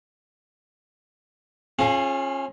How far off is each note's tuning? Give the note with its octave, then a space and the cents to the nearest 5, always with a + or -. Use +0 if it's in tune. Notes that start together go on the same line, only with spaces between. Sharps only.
C#4 -30 F4 +0 G#4 +25